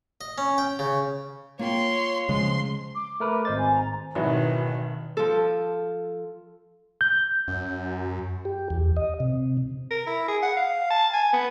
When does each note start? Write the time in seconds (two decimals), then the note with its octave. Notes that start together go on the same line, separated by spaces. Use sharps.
0.21 D#5
0.38 C#4
0.58 G5
0.79 C#3
1.59 A#3 F4 C#5 G5 C6
2.29 C#3 F3 G#3 C6
2.95 D6
3.20 A3 A#4 B4
3.45 G#1 C5 D#5 A6
3.58 G#5
3.74 A#5
4.15 G#1 B2 D#3 E3 F#3 E5 B5
5.17 F3 A4
7.01 G6
7.48 F#2
8.45 G4
8.70 E2
8.97 D#5
9.20 C3
9.91 A#4
10.07 E4
10.28 G#4
10.43 F#5
10.57 F5
10.91 A5
11.14 G#5
11.33 B3